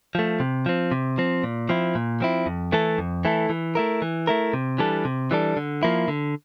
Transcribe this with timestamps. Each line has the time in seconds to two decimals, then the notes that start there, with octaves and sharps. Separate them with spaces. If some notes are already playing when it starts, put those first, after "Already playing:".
0.15 F3 A3
0.40 C3
0.66 F3 C4
0.92 C3
1.18 F3 C4
1.44 A#2
1.69 F3 C4 E4
1.95 A#2
2.21 F3 C4 E4
2.46 F2
2.72 E3 A3 E4 A4
2.98 F2
3.25 E3 A3 E4 A4
3.50 E3
3.75 A3 E4 A#4
4.02 E3
4.27 A3 E4 A#4
4.54 C3
4.78 E3 G3 D4 A4
5.05 C3
5.31 E3 G3 D4 A4
5.57 D3
5.83 F3 A#3 E4
6.08 D3